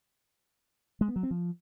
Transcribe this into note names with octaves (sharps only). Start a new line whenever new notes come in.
G#3
B3
F#3
C4
F3